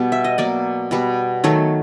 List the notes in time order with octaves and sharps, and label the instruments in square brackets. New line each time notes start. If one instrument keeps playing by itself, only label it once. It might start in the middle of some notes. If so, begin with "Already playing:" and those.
Already playing: [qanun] B2 G3 B3
E5
D#5
B2 F#3 A#3 D5
B2 G3 B3
D#3 F#3 A3 C#5